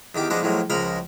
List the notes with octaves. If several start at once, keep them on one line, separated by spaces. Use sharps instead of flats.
E2 D#3 G4 D6
F3 G#3 B3 D4 D5 D#5
A2 F3 F#3 G#3 A#3
C#2 F3 G#3 A#4 A#5 B5